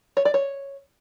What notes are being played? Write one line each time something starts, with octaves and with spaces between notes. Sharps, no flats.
C#5
D5
C#5